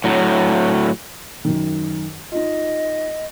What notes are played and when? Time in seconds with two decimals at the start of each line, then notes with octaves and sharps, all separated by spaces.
0.04 A2 F#3
1.45 F#2 D#3
2.32 D#4 F4 D#5